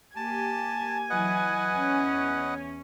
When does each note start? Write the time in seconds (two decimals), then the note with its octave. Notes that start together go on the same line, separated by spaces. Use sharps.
0.16 A#3 G4 G#5 A5
1.10 E3 F#3 E4 B4 D#5 F#5
1.71 E2 C#4